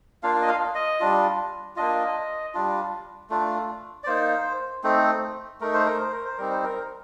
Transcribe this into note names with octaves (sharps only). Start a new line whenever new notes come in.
A#3 D4 F4 F5
D#5
F5
D#5
G3 D4 F4
A#3 D4 F4 D#5
G3 D4 F4
A3 D4 F4
D5
A#3 D#4 C5
A3 C4 D#4
A3 D#4 A#4
C5
A#4
C5
A#4
C5
G3 C4 D#4 A#4
C5
A#4